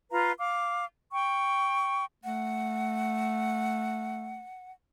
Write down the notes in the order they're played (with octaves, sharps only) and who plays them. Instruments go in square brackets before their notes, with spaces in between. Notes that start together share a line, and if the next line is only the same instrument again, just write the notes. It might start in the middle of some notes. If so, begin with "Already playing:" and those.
[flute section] F4 B4 F5 A#5
F5 D6
G5 C#6
[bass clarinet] A3 [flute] F#5